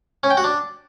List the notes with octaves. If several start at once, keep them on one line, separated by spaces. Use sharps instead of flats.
C#4
G5
F#4
D4